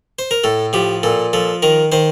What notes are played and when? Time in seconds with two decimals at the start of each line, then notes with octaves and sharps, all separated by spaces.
0.19 C5
0.31 A#4
0.44 A2 A4
0.73 F3 G4
1.03 A#2 A4
1.33 F3 A4
1.62 D#3 A#4
1.92 D#3 C5